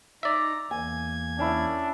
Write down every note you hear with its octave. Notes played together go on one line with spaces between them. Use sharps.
D#4 D5 E5 A#5
E2 A#3 G#5 G#6
C#4 D4 E4